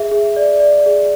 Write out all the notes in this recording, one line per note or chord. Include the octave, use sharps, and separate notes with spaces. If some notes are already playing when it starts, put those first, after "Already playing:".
Already playing: G#4 E5
G#4
D5
D5
G#4